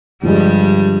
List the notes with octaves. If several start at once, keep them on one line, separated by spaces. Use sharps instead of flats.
G2 D3 F3 G3 G#3